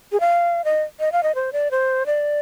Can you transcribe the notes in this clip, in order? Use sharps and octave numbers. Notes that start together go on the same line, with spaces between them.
G#4
F5
D#5
D#5
F5
D#5
C5
D5
C5
D5